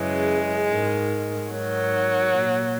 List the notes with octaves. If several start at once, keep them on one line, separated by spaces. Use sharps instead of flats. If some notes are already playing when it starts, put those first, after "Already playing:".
Already playing: F#2 C#3 E3 G#3
G#2 D#3
G#2 D#3 F#3
A#2